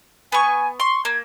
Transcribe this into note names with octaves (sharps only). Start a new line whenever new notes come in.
B3 G#5 C#6
C6 C#6
A#3 G#6